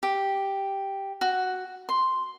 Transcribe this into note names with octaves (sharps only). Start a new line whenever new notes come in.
G4
F#4
C6